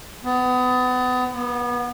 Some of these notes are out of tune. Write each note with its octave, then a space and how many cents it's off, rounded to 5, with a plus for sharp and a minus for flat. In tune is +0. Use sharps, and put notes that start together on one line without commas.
B3 +30
B3 -30